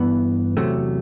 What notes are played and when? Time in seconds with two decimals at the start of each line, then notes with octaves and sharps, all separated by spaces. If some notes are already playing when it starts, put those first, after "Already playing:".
Already playing: G2 E3 B3
0.57 E2 C3 F#3 A3